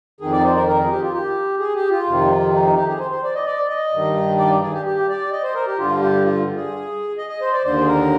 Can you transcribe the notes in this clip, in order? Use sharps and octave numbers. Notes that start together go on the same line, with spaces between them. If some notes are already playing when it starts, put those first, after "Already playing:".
F2 D#3 G#4
D5
C5
A#4
A#4
G#4
G4
F4
G4
G#4
G4
F4
F2 C3 D#3
D#4
D#4
G4
G#4
C5
C5
D5
D#5
D5
D#5
G2 D#3
D5
G#4
G4
G4
D5
D#5
C5
A#4
G4
G2 D3 F4
G4
F4
G#4
D#5
D#5
C5
D5
D#2 D3 C5
G#4
A#4